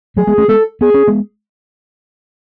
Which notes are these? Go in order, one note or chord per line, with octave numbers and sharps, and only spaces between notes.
F#3 A3 G#4
G#3 B3
A3 C#4
G#3 B3 A4
B3 G#4
C#4
G#3 B3